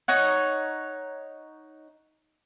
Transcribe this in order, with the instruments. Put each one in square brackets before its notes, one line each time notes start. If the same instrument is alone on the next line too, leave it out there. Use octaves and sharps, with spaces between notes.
[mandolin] D#4 C#5 F#5